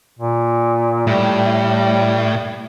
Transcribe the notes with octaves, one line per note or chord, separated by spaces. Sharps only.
A#2
A2 G3